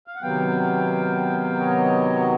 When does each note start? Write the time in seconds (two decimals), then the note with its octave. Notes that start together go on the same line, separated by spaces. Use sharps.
0.07 F5
0.15 F#5
0.23 C3 D#3 F#3 B3 F5 G5
1.59 C#5 D#5
2.21 D#5